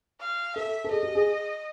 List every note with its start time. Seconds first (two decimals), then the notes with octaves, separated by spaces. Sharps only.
0.20 F5
0.56 A4 E5
0.84 A4
0.91 G#4 D#5
1.03 G4
1.15 G#4